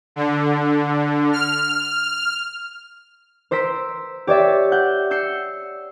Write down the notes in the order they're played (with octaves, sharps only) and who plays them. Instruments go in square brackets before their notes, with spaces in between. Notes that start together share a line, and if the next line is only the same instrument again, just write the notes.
[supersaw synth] D3
F6
[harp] A#4 C5 E6 B6 D7
G4 C#5 D5 E5
F#5 G6
E6 G6 C7 C#7